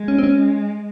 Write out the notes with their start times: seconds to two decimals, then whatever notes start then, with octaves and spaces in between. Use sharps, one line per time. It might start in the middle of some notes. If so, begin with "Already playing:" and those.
Already playing: G#3
0.08 C#4
0.18 C4
0.24 C#4